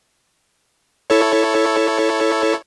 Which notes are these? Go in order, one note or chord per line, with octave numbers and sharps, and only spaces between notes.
E4 A4 C#5